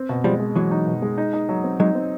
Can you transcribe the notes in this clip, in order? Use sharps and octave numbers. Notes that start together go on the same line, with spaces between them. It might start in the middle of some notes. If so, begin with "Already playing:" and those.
Already playing: C4
B2
F3 G3 G#3
G#3
E3 F#3 G#3
D#4
B2
G#3
D#4
D#4
F#3
C4
F#3 G#3 D#4
C4